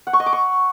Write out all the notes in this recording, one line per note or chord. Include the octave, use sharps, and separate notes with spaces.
F#5
C#6
D#5
D6
C#6